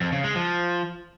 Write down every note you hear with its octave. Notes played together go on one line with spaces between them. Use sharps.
F2
C#3
G#3
F3